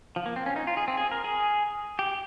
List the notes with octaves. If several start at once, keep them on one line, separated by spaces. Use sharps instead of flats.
F3
A#3
C4
C#4
D#4
F4
G#4
C4
G#4
A#4
G#4
G4